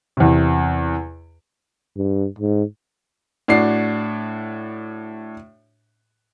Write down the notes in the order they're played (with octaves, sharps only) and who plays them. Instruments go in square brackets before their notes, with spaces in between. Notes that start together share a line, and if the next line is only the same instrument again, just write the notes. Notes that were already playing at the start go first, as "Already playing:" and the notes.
[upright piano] E2 C3
[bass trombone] G2
G#2
[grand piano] A2 D4 F#4 C7